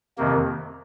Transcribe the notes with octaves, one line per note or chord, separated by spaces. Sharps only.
F2 C3 D#3 A#3